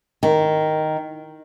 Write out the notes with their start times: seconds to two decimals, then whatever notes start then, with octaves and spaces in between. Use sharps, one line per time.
0.23 D#3